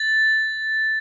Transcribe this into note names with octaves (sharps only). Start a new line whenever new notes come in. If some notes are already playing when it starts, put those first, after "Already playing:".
Already playing: A6